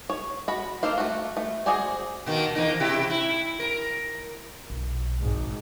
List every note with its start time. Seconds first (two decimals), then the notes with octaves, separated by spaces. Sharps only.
0.10 C#5
0.48 F#4 B5
0.83 A#3 A4 C5 F5
0.98 A3 F#4
1.37 A3
1.66 F#4 G#4 C5 D5 G#5
2.26 B2 D#3 A#3
2.55 E2 A#3 D#4
2.80 C3 E4 G4
3.10 E4
3.60 A#4
4.70 B1
5.19 G#1 G#2